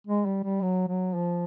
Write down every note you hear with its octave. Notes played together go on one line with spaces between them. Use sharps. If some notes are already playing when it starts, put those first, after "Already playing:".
G#3
G3
G3
F#3
F#3
F3